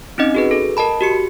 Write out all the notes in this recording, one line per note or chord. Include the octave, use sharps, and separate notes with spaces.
C4 C#4 D#4 D#5
F#4 G#4 B4
A4
A#4 D#5 A5 B5
F#4 G4 C#7